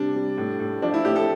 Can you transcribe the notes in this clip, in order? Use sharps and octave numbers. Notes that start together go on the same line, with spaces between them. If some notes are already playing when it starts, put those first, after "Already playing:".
Already playing: C3 G3 D4
G3
A2
A2
F3 D4
E4
A2 G4
A4